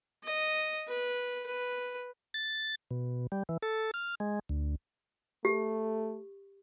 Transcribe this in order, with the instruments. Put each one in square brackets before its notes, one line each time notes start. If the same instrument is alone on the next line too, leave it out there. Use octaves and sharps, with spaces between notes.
[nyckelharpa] D#5
B4
B4
[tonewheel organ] A6
B2
G3
E3
A4
F6
G#3
D2
[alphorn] A3 [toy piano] G4